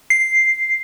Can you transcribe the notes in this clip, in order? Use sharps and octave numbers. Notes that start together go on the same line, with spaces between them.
C7